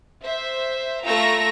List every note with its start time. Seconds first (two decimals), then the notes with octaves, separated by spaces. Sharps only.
0.24 C5 E5
1.07 A3 F4 A#5 C#6 E6 A#6